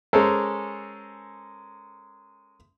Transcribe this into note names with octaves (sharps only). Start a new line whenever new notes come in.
G#3 C#4 A4 A#4 C5